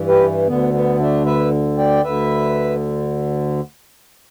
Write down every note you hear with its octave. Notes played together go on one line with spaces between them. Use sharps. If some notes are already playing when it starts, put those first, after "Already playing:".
Already playing: G2 E3
G4 B4
D2 D3 B3
B3
A3 D4
B4 E5
D5 G5
D2 D3 B4 E5